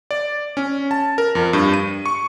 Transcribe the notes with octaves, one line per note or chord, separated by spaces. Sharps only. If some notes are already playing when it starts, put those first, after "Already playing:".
D5
C#4
A5
A#4
F2
G2
D#7
C#6